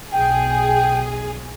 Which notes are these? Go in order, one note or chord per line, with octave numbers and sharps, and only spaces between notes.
B1 G#4 G5